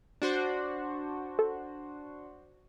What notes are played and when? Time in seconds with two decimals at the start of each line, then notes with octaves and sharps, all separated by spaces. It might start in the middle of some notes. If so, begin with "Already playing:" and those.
0.22 D4 F#4 C5
1.39 A4